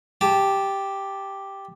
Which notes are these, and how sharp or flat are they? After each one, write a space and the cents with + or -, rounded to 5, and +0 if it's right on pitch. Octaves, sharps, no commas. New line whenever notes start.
G4 +0 A5 -15